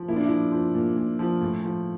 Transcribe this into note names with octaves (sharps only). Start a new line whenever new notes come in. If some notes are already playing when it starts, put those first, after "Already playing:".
Already playing: F3
A#2 E4
D4
F3 E4
F3
A#2
A#2
F3
A2
F3